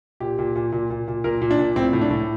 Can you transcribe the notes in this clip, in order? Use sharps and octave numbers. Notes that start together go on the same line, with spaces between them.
A#2 G4
A#2
A#2
A#2
A#2
A#2
A#2 A#4
A#2
D4
A#2
A2 C4
A2
D4
A2